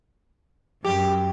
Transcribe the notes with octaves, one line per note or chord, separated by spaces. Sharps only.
F#2 G4